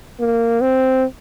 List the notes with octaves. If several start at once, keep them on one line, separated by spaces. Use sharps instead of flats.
A#3
C4